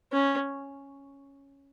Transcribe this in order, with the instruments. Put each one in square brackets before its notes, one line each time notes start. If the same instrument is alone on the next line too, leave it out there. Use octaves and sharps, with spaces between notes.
[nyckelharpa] C#4